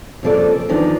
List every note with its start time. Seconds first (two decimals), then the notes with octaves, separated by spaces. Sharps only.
0.23 F2 C#3 F3 A#3 A4 D5
0.69 E2 D#3 F3 D4